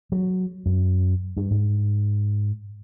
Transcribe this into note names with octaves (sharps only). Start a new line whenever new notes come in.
F#3
F#2
G2
G#2